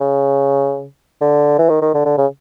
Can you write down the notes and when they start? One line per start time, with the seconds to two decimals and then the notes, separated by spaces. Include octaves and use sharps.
0.01 C#3
1.21 D3
1.59 E3
1.70 D#3
1.82 D#3
1.94 D3
2.06 D3
2.18 C#3